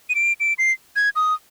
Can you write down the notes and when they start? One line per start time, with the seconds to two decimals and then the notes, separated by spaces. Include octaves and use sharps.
0.10 D#7
0.15 D7
0.40 D7
0.59 C7
0.96 G#6
1.16 D#6